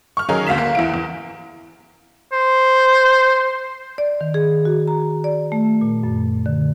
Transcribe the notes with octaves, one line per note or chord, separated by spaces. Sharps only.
C#6 F6
D#3 F#3 C#4 D#4 G#4 A#4
G1 D2 F5 B6 E7
A#3
E2 E4 D7
E2
C5
D5
D#3
G#4
F#4
A#5
D5
A3
A#2
F#2
D3